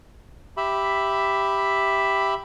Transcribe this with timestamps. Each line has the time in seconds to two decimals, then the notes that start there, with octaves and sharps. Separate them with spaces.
0.57 G4 E5 B5